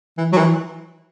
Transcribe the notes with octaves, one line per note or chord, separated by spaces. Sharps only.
E3
F#3
E3